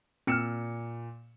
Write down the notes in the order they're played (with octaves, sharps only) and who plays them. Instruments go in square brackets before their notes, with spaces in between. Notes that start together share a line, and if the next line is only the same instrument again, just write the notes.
[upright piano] A#2 C#7 E7 [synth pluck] C4 E6 F6